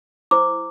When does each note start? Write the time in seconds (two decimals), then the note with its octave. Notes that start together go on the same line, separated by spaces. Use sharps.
0.31 E4 C5 D6